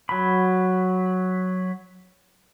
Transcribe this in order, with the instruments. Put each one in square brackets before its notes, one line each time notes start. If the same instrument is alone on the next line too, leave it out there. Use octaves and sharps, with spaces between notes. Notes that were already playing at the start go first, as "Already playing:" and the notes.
[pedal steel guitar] F#3 B5